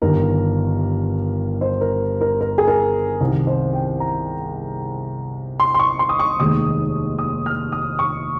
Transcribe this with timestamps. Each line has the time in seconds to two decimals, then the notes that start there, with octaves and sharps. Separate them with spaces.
0.02 G1 G2 D#3 A#4
1.61 C5
1.81 A#4
2.21 A#4
2.41 A#4
2.58 G#4
2.67 A#4
3.21 C2 C3 D#3
3.47 C5
3.73 G5
4.00 A#5
5.60 C6
5.74 C6
5.80 C#6
5.99 C6
6.09 D#6
6.19 C#6
6.40 F1 D#2 D#3 G#3 D#4 D#6
7.18 D#6
7.46 F6
7.72 D#6
7.99 C#6